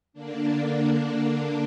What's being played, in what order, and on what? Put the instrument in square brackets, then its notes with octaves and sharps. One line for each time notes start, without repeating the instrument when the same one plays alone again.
[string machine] D3 A#3 D4